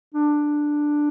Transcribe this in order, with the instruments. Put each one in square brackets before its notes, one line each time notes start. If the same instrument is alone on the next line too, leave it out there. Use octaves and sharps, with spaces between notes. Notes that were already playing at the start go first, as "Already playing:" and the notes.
[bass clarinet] D4